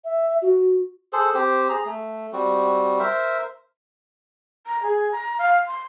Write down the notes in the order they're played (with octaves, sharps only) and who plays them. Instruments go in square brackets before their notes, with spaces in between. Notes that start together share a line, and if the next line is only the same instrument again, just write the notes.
[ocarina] E5
F#4
[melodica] G#4 A4 C5
C4 G4 C5
G#4 A#5
A3
G3 C4 F#4
A#4 C5 E5
[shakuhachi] A#5
G#4
A#5
F5
C6